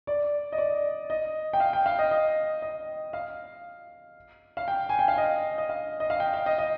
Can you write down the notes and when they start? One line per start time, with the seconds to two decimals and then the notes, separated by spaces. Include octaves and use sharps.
0.07 D5
0.52 D#5
0.58 D5
1.10 D#5
1.53 G5
1.60 F5
1.73 G5
1.86 F5
1.99 D#5
2.11 D#5
2.62 D#5
3.13 F5
4.57 F5
4.68 G5
4.89 G#5
4.99 G5
5.08 F5
5.18 D#5
5.58 D#5
5.69 F5
6.00 D#5
6.10 F5
6.20 G5
6.34 F5
6.46 D#5
6.58 D#5